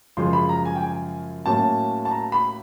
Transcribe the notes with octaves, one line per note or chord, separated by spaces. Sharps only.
F#2 C#3 F3 G#3 C6
B5
A#5
G#5
G5
G#5
A2 F#3 A#3 C#4 A5
A5
A#5
B5